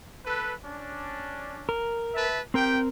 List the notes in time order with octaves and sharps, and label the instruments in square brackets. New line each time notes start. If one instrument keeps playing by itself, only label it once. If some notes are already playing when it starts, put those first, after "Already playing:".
[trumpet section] A4 B4
C#4 D4
[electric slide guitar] A#4
[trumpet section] B4 E5 A5
[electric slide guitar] C4 A#4 [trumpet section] G4 G5